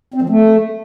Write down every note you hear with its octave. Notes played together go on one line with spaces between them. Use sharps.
C4
F3
A3